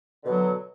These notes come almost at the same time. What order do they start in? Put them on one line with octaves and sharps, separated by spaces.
D3 B2 F#3